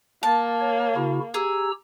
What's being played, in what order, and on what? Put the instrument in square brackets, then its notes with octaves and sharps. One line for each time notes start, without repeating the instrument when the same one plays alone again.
[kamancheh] A#3 [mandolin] A5
[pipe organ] C#5
C#3 E4 F#4
[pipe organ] G4 A#5 E6 [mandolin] G#4